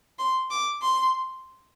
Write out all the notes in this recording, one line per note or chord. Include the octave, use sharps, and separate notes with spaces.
C6
D6
C6